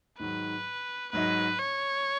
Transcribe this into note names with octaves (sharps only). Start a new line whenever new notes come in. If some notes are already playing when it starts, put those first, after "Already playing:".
G#2 D#3 F#3 B4
G#2 F#3 D#4 B4
C#5